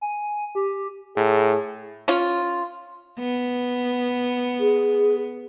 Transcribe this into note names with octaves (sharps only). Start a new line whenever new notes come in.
G#5
G4
A2 G#4
C#4 F4
B3
G#4